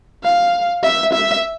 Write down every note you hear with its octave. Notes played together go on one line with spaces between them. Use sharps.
F5
E5
E5